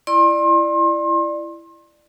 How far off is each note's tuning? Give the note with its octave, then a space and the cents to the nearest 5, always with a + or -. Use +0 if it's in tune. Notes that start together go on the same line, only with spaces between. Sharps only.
E4 +20 D5 +20 C6 +35